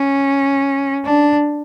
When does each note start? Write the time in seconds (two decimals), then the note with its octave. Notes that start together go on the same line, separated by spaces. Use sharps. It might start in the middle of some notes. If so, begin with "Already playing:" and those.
Already playing: C#4
1.05 D4